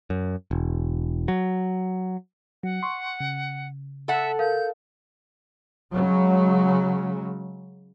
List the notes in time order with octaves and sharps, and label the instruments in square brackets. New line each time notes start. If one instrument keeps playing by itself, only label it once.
[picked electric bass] F#2
E1
F#3
[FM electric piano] F#3 [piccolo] F#5
[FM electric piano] C6 C#6
C#3
[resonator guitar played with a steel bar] A4 F#5 [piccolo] E5
[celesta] A#4 F5 [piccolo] G6
[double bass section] C#3 F#3 G#3